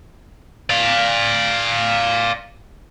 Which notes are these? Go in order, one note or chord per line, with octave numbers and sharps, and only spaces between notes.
D5 F5